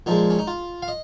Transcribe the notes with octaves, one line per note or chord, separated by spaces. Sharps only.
A#2 F3 G#3 D#4
C#4
D#4
F4
F5
D#5